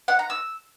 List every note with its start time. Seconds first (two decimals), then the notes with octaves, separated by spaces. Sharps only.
0.08 F#5
0.19 A#5
0.30 E6